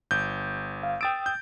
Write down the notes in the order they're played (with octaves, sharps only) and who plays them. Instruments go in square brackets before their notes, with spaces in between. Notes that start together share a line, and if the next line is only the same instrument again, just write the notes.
[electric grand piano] G1 G6
[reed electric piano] F5
[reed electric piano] G5 D#6 E6 [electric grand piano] A6 D7
[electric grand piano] G6